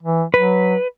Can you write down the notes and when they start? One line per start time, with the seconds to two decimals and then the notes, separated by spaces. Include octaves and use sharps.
0.03 E3
0.34 F#3 B4